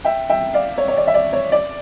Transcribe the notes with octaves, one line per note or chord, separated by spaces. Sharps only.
E5 G5
E5 G5
D5 F5
C#5
C#5
D5
E5
D5
C#5
D5